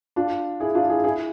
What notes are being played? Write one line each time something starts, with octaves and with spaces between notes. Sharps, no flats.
D4 F4
E4 G#4
D4 F4
E4 G#4
E4 G#4